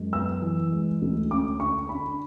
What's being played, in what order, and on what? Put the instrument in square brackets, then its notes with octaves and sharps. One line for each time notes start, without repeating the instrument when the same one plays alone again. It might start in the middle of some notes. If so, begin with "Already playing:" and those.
Already playing: [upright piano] F#2 G#3
B3 E6
E3
G#3
D2
C#4 D6
D3 C#6
D4 B5